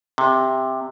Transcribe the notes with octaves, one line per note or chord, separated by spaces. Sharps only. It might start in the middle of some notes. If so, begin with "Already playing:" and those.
C3